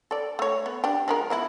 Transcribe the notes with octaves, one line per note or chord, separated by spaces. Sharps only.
A4 D5
A3 C#5
B3
D4 G4
F3 G#3 A#4
F3 B3 E4